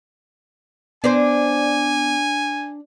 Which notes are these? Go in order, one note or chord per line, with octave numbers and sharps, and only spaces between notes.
B3 D4 C5 G#5